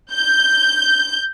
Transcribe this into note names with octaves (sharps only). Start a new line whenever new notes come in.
G6